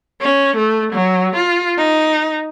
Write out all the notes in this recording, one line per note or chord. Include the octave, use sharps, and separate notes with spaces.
C#4
A3
F#3
F4
D#4